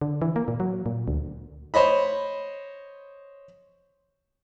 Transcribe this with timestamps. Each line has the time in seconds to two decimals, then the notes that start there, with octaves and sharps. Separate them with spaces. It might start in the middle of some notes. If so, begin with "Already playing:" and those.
0.01 D3
0.22 E3
0.36 A#3
0.48 A#2
0.60 F#3
0.86 A#2
1.08 D2
1.74 C5 C#5 D#5 B5